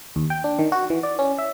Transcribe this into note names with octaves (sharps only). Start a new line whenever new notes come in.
D#2
G5
D4
D#3
F#4
E3
D5
C#4
E5